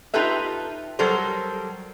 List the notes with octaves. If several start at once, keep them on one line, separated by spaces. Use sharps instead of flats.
D#4 F4 G4 A4 B4 E5
F#3 G3 A4 A#4 C5